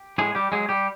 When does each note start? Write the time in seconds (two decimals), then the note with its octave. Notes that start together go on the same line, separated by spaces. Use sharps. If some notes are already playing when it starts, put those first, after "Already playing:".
Already playing: G4
0.18 A2 G#3 G#4
0.35 G3 G4
0.52 F#3 G#3 G#4
0.69 G3 G4